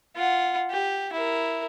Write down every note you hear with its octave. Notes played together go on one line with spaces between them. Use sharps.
F4 F#5
G4
E4 A#4